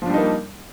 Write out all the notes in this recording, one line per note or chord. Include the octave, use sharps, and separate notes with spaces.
F3 G3 A#3 D4 D#4